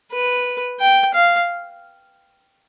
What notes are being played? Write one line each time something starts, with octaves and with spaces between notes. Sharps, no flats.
B4
G5
F5